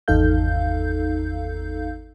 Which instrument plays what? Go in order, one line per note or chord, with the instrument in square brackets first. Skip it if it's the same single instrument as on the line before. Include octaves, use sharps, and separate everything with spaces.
[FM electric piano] G#1 E2 D#4 A4 F5 G6